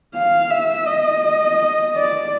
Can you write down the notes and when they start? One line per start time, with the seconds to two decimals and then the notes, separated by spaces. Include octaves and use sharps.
0.15 F5
0.50 E5
0.87 D#5
1.96 D5